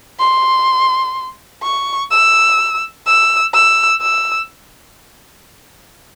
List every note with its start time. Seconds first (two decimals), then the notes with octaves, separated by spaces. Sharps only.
0.20 C6
1.63 C#6
2.11 E6
3.07 E6
3.54 E6
4.01 E6